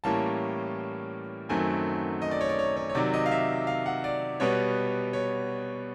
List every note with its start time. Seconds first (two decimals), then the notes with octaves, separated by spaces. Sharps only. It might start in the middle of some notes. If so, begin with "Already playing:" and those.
0.04 A2 E3 G3 A#3 C#4 A5
1.49 F#2 D#3 F#3 A3 C4 G#5
2.22 D#5
2.31 D5
2.41 C#5
2.49 D5
2.59 C#5
2.77 C#5
2.90 C#5
2.95 C3 D#3 F#3 D5
3.14 D#5
3.26 F5
3.31 E5
3.67 F5
3.86 F#5
4.04 D5
4.40 B2 G3 B3 C#5
5.13 C#5